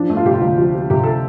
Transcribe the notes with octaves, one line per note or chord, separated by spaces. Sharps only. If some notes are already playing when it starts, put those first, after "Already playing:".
Already playing: F3 D4
A3
F4
C3 G4
F4
D2
F3
F3
C3 G4
A4